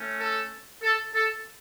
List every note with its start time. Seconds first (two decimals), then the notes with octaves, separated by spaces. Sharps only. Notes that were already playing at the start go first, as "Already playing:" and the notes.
Already playing: A3 C#4
0.19 A4
0.83 A4
1.14 A4